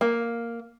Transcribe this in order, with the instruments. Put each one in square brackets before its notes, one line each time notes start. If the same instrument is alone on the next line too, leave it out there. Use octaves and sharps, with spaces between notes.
[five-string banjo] A#3